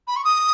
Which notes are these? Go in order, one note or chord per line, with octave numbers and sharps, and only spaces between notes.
B5
C#6
D#6